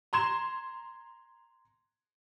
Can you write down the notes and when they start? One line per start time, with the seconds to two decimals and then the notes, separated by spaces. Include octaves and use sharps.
0.13 A#5 C6 G#6 E7